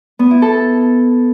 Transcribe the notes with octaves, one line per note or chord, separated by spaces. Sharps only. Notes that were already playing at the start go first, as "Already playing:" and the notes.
B3
E4
A4